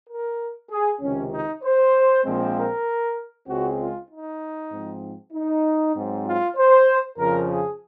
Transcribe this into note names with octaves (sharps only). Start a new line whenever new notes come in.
A#4
G#4
C#2 C3 D#3 C#4
D#4
C5
A#1 A#2 F3 G#3 C4
A#4
C#2 C#3 G#3 C4 F#4
F4
D#4
G#2 F3 C4
D#4
G#2 F#3 C4
F4
C5
F2 C#3 F3 A#4
G#4